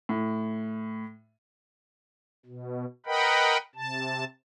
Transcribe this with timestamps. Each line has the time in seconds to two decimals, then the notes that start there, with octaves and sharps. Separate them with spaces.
0.09 A2
2.46 B2
3.06 A#4 B4 D#5 F#5 G5 B5
3.75 C3 A5